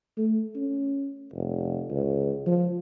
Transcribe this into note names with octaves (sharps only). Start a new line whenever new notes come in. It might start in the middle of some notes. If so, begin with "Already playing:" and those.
A3
C#4
F1
C#2
F3